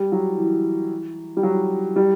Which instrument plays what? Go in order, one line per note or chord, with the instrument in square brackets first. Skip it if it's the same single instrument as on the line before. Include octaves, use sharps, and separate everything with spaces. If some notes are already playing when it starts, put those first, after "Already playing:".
Already playing: [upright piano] G3
F#3
E3
G3
F#3
G3